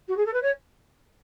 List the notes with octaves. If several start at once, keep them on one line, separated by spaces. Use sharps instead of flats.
F#4
G#4
A4
B4
C#5